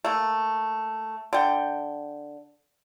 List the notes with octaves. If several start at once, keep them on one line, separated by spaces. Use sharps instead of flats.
A3 A#3
D3 G5